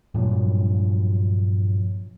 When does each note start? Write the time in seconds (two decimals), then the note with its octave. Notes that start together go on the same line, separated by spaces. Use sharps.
0.14 G2 A#2 F3 F#3